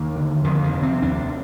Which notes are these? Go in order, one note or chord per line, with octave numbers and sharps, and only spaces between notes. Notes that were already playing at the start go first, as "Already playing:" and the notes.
Already playing: D#2 D#3
D3
F2 D#3
D#3
C3
C4
D#2 D4